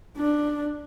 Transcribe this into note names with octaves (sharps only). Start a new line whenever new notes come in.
D4